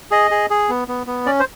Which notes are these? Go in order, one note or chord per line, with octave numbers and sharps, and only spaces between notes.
G#4 D#5
G#4
G#4
B3
B3
B3
C#4 D5
C5